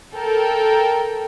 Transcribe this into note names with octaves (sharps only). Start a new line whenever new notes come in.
A4 A#4 G5